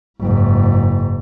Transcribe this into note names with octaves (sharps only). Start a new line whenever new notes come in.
F#1 G#2